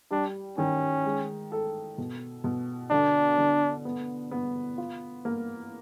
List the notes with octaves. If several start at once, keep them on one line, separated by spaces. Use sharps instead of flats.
G3 D4
D#3 C#4
G#3
A4
B2
B2
D3 D4
D3
B3
B3
F4
A#3